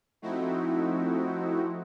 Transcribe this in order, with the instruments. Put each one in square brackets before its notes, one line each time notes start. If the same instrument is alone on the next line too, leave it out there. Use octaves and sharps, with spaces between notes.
[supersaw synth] F3 A3 C4 D#4 E4 F#4